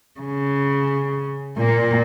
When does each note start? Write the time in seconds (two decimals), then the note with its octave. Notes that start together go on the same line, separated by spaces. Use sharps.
0.21 C#3
1.58 A#2 A#3